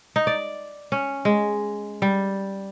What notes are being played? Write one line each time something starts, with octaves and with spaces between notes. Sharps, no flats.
D#4
D5
C#4
G#3
G3